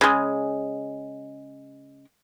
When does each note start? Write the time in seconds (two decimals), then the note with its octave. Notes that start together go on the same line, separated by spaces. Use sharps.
0.01 C#3 G#3